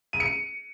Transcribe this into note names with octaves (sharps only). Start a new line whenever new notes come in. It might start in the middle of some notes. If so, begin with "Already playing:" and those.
D#7
C#7